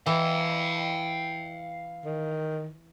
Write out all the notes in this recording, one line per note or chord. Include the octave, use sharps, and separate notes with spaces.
E3 E4 F5 G5
D#3